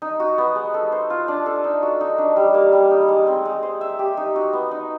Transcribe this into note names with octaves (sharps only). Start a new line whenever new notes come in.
D#4
F#4
B3
G#3
A4
C5
F4
D4
A4
D#4
F#4
D#4
D4
G3
A#3
G3
D#4
G#3
C4
G#3
C5
E5
G4
D#4
F#4
B3
D#4